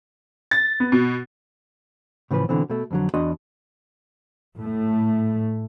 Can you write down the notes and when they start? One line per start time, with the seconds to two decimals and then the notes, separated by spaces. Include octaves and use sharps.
0.51 A6
0.80 B3
0.92 B2
2.31 A2 C#3 E3 F3 B4
2.49 B2 D3 E3 C4
2.70 B2 A3
2.91 F2 D3 F#3
3.14 E2 D4 F#4 D5 D#5 C6
4.56 A2 A3